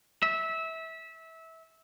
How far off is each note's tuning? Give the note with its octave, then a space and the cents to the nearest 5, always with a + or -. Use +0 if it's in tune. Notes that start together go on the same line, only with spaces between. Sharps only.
E5 -20